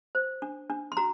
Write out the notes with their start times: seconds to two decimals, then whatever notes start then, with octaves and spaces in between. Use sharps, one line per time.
0.15 C5
0.42 D4
0.70 D4
0.92 C6
0.97 F#4 A#5